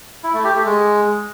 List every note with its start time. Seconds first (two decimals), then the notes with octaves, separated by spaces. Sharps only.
0.24 E4
0.34 A3
0.44 G4
0.55 A3
0.65 G#3